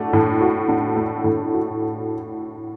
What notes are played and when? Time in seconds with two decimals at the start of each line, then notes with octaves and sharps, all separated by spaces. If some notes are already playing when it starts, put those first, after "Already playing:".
Already playing: A2 A3 D4 F#4
0.13 A2
0.40 F#4
0.68 D4
0.96 A3
1.24 A2
1.53 F#4